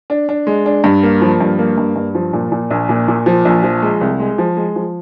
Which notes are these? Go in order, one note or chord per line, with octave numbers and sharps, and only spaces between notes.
D4
D4
G#3
D4
G2
A#3
F3
G2
A#3
G2
G2
F3
A#2
A#2
A#1
A#2
A#2
F3
A#1
F3
G#3
C2
G#3
F3
G#3
F3